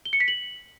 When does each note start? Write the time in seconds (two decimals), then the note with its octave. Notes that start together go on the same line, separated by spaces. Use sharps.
0.05 G7
0.13 C#7
0.20 B6
0.28 F#7